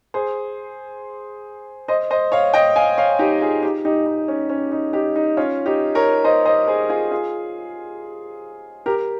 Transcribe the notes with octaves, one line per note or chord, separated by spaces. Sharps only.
G#4 C5
C5 D#5
C5 D#5
C#5 F5
D#5 G5
F5 G#5
C#5 F5
D#4 G4
F4 G#4
D#4 G4
D#4 G4
D#4
C#4
C#4
D#4
D#4 G4
D#4
C#4 F4
D#4 G4
A#4 C#5
C5 D#5
C5 D#5
G#4 C5
F4 G#4
F4 G#4
G4 A#4